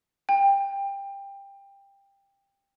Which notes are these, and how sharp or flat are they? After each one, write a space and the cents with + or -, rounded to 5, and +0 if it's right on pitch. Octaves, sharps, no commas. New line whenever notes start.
G5 +20